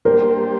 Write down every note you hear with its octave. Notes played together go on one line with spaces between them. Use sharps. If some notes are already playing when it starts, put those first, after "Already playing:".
G3 A#3 D4 G4 A#4 C5